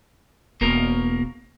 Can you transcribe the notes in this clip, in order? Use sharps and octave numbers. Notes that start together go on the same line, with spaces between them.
E1 B2 A#3 A#4